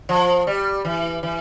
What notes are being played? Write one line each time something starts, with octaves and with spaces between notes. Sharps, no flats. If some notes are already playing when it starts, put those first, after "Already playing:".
F3
G3
E3
E3